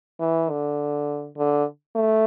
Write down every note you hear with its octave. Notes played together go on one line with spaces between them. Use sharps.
E3
D3
D3
A3